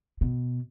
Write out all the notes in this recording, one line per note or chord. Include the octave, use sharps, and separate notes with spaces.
B2